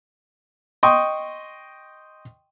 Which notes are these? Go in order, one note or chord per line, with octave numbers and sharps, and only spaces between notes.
D#5 G5 C6 C#6 D#6